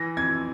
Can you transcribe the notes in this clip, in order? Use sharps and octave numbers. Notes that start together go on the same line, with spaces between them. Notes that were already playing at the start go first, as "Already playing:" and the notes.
Already playing: E3 A#6
F2 G#6